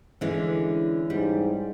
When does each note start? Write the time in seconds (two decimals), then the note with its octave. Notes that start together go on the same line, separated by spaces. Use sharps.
0.21 D3 E3 G#3 C#4
1.10 G#2 G3